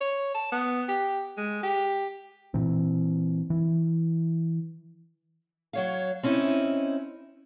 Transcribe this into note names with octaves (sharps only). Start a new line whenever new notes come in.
C#5
A5
B3
G4
G#3
G4
A#2 E3 C4
E3
F#3 C#5 F5
C4 C#4 D#4 E4